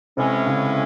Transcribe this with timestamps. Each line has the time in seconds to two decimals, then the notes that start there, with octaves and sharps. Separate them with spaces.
0.17 A2 C3 E3 G#3 C#4
0.46 C#3